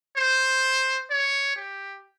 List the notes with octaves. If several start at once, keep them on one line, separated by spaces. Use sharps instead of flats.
C5
C#5
G4